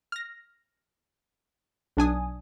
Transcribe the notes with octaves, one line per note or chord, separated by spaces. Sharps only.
F6 A#6
B1 D4 G#5 D#6